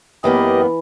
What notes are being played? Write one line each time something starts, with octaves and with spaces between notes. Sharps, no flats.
F#2 E3 A#3 B3 G4 D#5